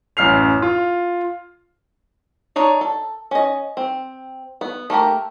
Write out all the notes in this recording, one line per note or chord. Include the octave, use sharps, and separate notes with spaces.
A1 F#2 F6 C7 F7
F4
D4 D#4 C#5 D5
A4
C#4 D#5
C4
B3
A3 A#3 G4 A#4